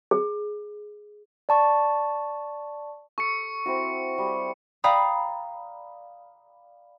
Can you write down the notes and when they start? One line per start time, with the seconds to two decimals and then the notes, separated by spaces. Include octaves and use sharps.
0.11 G#4
1.49 D5 A5 C#6
3.18 A4 C#6 C#7
3.66 C4 E4 F#4
4.18 G3
4.84 D5 F5 G5 A#5 B5 D#6